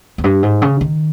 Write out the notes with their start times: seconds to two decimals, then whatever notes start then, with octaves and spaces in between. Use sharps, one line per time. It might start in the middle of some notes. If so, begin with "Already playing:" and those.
0.18 E2
0.24 G2
0.43 G#2
0.62 C#3
0.81 D#3